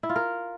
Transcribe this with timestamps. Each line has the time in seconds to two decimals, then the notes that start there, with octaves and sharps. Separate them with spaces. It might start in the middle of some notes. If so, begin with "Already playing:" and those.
0.03 E4
0.09 F4
0.16 A#4